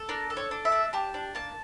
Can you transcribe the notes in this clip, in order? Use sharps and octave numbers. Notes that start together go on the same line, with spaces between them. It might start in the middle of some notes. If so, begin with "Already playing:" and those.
Already playing: A4
D4 A#4
A4
C#5
D4
E5
D4
G4 A5
D4
A#3 A5